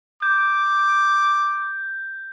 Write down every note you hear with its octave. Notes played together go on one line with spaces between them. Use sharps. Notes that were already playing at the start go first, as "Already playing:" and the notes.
D6 G6